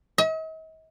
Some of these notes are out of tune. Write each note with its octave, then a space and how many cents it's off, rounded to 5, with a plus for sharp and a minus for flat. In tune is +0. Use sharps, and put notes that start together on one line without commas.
D#5 +45